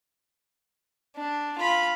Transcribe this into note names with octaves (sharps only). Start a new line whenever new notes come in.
D4
F4 B5